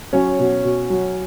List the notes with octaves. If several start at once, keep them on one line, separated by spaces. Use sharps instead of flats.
F#3 C#4 C#5
B2
B2
F#3